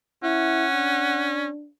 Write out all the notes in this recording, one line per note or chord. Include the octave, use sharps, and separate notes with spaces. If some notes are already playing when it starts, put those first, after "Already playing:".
C#4 E4 F#5
D4